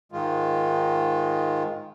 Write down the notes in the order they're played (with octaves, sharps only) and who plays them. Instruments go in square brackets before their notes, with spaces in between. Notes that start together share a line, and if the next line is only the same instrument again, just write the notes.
[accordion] G#2 D#3 G#3 F4